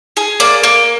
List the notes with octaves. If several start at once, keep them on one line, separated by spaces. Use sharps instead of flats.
G#4
A#3 D5
A#3